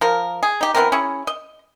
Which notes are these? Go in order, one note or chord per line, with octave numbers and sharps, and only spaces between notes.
F3 A#4
G#4
D#4 G4
E3 B3 C4 A#4
C#4 E4 G#4 C#6
D#5